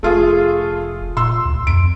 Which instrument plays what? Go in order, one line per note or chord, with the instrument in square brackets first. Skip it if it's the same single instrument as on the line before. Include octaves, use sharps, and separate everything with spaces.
[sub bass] F1 [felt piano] A3 F4 G#4
[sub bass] A#2 [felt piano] C6 E6
[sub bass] D2
[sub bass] F2 [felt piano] D7